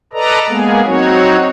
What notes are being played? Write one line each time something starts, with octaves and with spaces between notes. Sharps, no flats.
A4 B4 D5 D#5 A#5
G#3 A#3 B3 G#4
F#3 C4 D#4 F#4 C#5